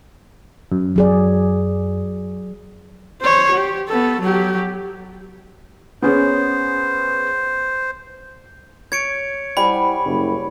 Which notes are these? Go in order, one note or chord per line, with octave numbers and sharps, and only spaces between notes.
F#2
F#3 G#4 D5
C5 C#5
G4
B3 A4
F#3 G4
B3 C#4 G#4 C5
C#5 G#6 C#7 D7
G3 E4 C5 F#5 G#5 B5
F#1